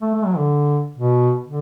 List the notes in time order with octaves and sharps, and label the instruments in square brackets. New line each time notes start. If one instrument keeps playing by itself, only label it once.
[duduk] A3
A3
F#3
D3
B2
D3